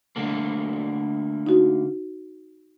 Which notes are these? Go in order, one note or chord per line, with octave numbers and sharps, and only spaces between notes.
D3 A3 A#3
D#4 F#4